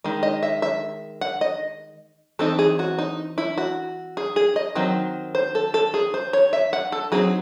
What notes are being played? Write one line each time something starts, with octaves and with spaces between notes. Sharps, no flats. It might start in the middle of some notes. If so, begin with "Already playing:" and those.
D#3 G#3
D#5
E5
E5
F#5
D#5
E3 C4 D#4 A4
G#4
F#4
D#4
E4
F#4
G#4
G#4
D#5
D#3 F#3 C4
C5
A4
A4
G#4
C5
C#5
E5
F#5
A4
F#3 C4 D#4 G#4